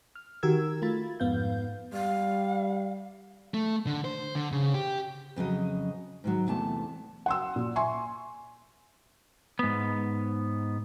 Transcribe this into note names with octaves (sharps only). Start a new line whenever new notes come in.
F6
D#3 F#4 G4 A#4 E6 G#6
A3 F4 B5 A6
F2 G#2 B3 F5 G6
G3 F5
A3
D3
C5
D3
C#3
G4
F2 C#3 F#3 D#5
G#2 D#3 F#3
E2 C3 A3 A5
F#5 C6 E6
A#2
E5 G#5 C6 C#6
G#2 B3